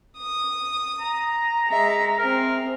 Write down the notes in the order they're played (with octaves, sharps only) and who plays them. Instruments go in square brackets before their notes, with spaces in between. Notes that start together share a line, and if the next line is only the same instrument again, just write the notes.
[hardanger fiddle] D#6
[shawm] A#5
[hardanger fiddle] G#3 E5
[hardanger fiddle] C4 G#4 [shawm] A#4